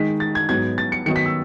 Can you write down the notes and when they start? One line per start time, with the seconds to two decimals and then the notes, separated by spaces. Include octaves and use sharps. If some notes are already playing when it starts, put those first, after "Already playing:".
Already playing: D#3 G#3 D#4 B6
0.20 A6
0.35 G#6
0.49 G#2 F#3 B3 G#6
0.78 A6
0.92 C#7
1.06 D#3 F#3 B3 D#4 C#7
1.16 B6
1.26 E6